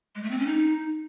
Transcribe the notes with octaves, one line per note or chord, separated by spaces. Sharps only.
G#3
A3
C4
C#4
D#4